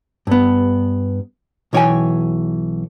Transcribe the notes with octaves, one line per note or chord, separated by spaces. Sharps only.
G2 B3
B1 E3 C#5 D5 G5 G#5